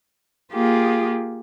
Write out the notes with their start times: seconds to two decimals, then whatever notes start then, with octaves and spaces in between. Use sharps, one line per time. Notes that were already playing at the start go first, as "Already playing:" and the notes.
0.53 A#3 F4 G4 G#4